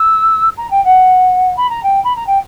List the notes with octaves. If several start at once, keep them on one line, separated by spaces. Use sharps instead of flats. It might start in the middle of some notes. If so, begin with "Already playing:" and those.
Already playing: E6
A#5
G5
F#5
B5
A#5
G5
B5
A#5
G5